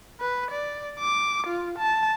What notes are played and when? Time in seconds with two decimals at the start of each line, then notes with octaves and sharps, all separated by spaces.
0.21 B4
0.51 D5
1.00 D6
1.47 F4
1.78 A5